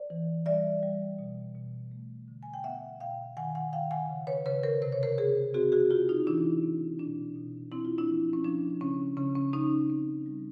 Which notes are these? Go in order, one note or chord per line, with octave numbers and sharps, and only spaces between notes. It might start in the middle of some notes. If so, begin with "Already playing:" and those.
Already playing: C5 D5
E3
G3 D5 E5
G3
B2
B2
A3
D3
G#5
G5
B3 E5 F#5
B2 F5 G5
D#3 F#5 G#5
F#5 G#5
D#3 F5 G5
F#5 G#5
C#3
B4 C#5
C#3 B4 C#5
A#4 C5
C3 C5
C#5
A#4 C5
C3 G#4 A#4
C4 F#4 G#4
F#4 G#4
C4 F4 G4
D#4 F4
E3 D4 E4
C4
B2 D4
B2
C4 E4
F4
D4 E4
F3
C#4
F3 D4
C#3 C#4
C#3 C#4
C#4
C#3 C#4 D#4
C4
G3